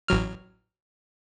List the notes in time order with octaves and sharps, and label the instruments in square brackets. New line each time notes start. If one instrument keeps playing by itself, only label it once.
[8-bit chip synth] A1 F#3 F6